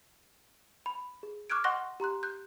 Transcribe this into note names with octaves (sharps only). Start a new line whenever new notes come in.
B5
G#4
C#6 D6 F6 F#6 G#6 D7
D#5 F#5 C6 C#6 F#6 A#6
G4 A#5 C6 F#6
F#6 G6